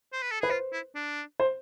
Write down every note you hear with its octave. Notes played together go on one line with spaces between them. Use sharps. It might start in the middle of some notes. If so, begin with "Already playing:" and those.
C5
B4
A4
G#4 B4
F4 C5
E4
D4
C5